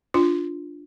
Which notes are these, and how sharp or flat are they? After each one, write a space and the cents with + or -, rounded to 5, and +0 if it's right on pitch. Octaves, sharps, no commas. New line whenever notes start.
D4 +0 F4 +0